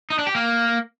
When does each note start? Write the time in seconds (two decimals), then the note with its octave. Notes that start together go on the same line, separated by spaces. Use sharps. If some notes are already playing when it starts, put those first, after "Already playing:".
0.10 D#4
0.19 D4
0.27 G4
0.35 A#3